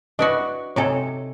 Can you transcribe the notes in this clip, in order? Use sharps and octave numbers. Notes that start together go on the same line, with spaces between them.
D4 E4 F#4 B4 D#5
C3 D#4 A4 C#5 G#5